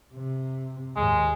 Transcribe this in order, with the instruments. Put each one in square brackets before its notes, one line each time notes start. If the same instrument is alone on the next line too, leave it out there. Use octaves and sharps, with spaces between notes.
[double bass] C3
[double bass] D#2 G#2 [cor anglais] G#3